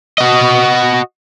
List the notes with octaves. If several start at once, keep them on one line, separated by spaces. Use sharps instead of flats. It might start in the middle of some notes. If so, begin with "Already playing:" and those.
F#4 D#5